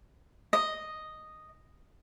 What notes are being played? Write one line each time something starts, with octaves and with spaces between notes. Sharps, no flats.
D#5